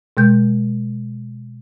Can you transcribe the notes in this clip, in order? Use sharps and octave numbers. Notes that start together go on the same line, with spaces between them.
B2 G#3 G6